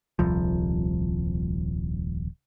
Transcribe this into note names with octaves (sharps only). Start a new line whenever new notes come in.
D#1 C2 F3